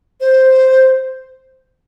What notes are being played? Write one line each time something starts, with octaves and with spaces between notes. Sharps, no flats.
C5